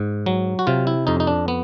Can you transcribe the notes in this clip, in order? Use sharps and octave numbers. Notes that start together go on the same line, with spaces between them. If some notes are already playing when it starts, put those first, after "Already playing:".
Already playing: G#2
F#3
F#4
C3 F4
E4
F2 D#4
D#4
D4
B3